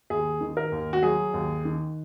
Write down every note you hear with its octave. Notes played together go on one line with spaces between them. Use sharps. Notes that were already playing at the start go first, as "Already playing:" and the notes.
D#2 G#4
D#3
A#4
D#2
F#4
F#3 G#4
D#2
D#3